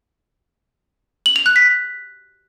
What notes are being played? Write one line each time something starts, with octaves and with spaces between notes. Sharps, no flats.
F#7
F7
F#6
B6